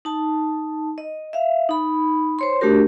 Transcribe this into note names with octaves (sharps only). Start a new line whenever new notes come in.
D#4 A5
D#5
E5 F5
D#4 B5
C5 C#5 C6
A3 D4 F#4 G4 A#4